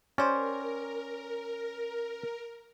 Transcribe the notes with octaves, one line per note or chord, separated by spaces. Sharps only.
C#4 G4 A#4 C5 D5